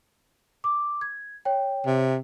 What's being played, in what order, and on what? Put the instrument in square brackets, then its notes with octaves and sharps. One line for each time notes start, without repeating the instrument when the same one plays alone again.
[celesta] D6
G#6
C#5 G5
[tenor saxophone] C3